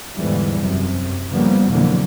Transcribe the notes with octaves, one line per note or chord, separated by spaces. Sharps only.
E2 G#2 D3 E3 G3
F#2 C3
C#3 F3 G3 A#3 B3
F2 B2 D3 E3 F#3 A#3